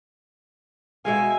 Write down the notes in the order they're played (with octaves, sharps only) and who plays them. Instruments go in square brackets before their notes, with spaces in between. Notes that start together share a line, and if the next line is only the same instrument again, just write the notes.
[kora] B2 G#3 F5 [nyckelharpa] E5 G#5